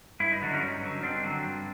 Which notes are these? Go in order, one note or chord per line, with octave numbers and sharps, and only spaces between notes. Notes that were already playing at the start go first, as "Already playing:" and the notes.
G2 E4
D#4
D3 F#3 D4
C#4 D#4
G2
D3 F#3
G2 C4 D4
D3 F#3
G2